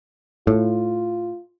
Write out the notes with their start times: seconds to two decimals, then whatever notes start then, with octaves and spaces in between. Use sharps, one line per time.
0.47 A2 F4